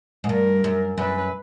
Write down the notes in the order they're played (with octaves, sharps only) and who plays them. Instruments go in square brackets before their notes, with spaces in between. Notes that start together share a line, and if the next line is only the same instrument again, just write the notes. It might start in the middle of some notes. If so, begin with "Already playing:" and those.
[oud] G#2
[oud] G2 [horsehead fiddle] A#4
[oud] F#2
[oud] F#2 [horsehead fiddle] B4